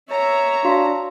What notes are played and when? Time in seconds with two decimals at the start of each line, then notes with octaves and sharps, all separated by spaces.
0.10 C#5 E5 A#5
0.65 D4 F#4 F5